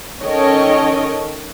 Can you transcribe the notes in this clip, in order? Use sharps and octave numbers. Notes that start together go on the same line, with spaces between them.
D#3 C#4 A4 C#5 D#5 G5